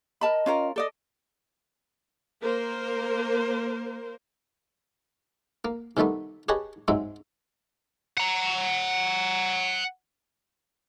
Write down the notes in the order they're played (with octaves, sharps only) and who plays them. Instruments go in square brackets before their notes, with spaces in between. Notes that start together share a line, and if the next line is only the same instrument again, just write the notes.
[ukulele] A#4 A5 B5 [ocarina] D#5
[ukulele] C#4 F4 A#4
A4 D5 D#5
[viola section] A#3 A#4 C5
[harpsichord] A#3
C3 D#3 G3 A3 B3
G4 G#4 B4 C#5 D#5 A5
G#2 F#3 G#3 C4 E5
[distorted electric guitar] F#5 A#5